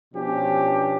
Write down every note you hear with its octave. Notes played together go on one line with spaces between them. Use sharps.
B2 F3 C#4 D4 G4